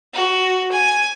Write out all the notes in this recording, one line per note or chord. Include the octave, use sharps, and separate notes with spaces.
F#4
G#5